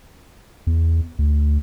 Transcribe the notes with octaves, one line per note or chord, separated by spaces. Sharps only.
E2
D2